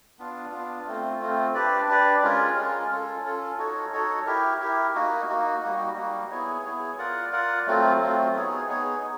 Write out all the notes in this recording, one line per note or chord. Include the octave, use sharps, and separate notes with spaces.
B3 D4 F4
B3 D4 F4
A3 C4 F4
A3 C4 F4
D4 G4 B4 D5
D4 G4 B4 D5
G#3 C#4 F4 A#4
G#3 C#4 F4 A#4
C#4 F4 A4
C#4 F4 A4
D#4 F#4 A4 C#5
D#4 F#4 A4 C#5
E4 G4 A#4
E4 G4 A#4
A#3 D#4 F#4
A#3 D#4 F#4
G3 A#3 D#4 F#4
G3 A#3 D#4 F#4
B3 E4 G#4 C#5
B3 E4 G#4 C#5
F4 A#4 D5 F#5
F4 A#4 D5 F#5
F#3 A3 C4 F4
F#3 A3 C4 F4
B3 D#4 G#4 C#5
B3 D#4 G#4 C#5
D#4